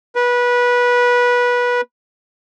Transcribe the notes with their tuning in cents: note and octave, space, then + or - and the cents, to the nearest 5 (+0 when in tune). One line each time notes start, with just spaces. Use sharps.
B4 -20